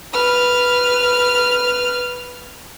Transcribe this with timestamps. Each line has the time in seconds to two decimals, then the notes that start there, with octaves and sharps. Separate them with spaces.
0.13 B4 F6